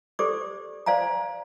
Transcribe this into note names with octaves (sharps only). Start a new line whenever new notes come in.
G4 A4 C5 D5 D6
C5 D5 F5 G#5 A#5